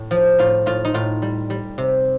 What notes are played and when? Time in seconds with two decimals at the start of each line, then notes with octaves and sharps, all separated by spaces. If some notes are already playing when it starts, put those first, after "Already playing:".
Already playing: A2
0.11 F3
0.39 A2 F4
0.66 A2 F4
0.85 D#4
0.94 A2 F4
1.22 G3
1.50 G3
1.78 C3